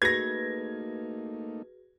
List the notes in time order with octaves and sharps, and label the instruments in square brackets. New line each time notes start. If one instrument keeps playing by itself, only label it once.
[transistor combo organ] A3 A#3 D#4 [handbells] F#4 G#4 B4 [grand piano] G#6 A#6